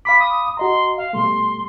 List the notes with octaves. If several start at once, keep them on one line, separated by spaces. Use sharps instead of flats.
F5 B5 D6 B6
D#6
F#4 D#5 A#5 C6
F5
B2 G3 A3 C6